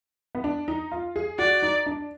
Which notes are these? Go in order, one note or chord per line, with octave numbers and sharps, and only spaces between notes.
B3
D4
D#4
F4
G#4
F#4 D5
D#4
D4